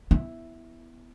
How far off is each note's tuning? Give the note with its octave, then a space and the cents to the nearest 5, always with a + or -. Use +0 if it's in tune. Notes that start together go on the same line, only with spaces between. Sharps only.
B3 +0 E4 +0